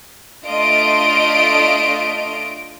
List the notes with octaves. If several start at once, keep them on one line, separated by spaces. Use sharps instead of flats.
A3 D4 F4 D#5 D7